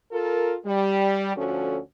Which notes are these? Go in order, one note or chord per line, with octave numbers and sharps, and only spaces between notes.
F4 A4 A#4
G3
D2 F3 C#4 F#4 A4